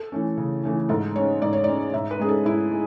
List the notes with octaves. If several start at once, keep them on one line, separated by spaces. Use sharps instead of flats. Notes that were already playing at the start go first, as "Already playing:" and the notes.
Already playing: A4
E3 A3 C#4
C#3
E3 A3 C#4
G#2 A4
G#3 C#4 C#5
G#2 D5
C#5
G#3 C#4 D5
G#2 E5
B4
G#3 C#4 G#4
A4
G#2 E4
G#3